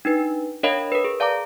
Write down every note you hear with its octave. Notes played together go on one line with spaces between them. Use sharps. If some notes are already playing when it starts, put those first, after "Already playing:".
D4 D#4 B4
D4 A#4 C#5 D#5 F5 B5
A#4 B4
G#4
D5 F5 A5 A#5 D6